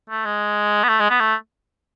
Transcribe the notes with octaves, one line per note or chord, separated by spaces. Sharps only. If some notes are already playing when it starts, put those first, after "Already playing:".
A3
G#3
B3
A3
G#3
B3
A3